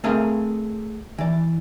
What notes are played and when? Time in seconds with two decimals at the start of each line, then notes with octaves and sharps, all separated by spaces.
0.04 A3 C4 G#4 A#4 D#5 F5
1.18 E3 D5